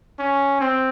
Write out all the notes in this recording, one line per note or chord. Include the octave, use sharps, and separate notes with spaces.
C#4
C4